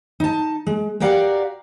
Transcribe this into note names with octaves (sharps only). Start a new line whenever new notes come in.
D#4 A5
G#3
F#4 G4 A#4 D5 F5 F#5